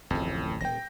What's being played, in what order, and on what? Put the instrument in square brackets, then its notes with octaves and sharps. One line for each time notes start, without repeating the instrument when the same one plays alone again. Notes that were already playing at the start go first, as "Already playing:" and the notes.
[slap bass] D1 A1 [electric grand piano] F2
[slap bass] D#1 [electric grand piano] G5 A#6